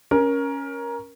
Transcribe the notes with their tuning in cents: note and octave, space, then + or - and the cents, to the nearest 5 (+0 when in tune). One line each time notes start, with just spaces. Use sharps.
C#4 +0 A#4 +15